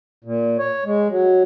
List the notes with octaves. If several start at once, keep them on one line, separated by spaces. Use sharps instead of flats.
A#2
C#5
G#3
F#3